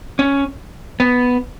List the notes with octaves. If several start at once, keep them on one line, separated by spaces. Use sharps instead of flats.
C#4
B3